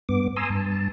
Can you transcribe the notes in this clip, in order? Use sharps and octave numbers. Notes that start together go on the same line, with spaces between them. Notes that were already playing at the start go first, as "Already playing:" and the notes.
G2 B3 D6
G#5 A#5 C6 D#6 E6
G2 A5